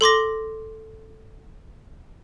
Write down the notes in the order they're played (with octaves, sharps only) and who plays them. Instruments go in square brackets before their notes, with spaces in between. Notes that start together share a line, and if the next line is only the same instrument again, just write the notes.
[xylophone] A4 C6 D6 A#6